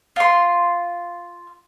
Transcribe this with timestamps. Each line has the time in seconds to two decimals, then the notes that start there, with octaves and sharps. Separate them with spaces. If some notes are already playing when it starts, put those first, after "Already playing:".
0.16 F4 C6